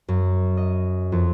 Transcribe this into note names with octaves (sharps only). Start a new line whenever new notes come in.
F#2
D#5
F2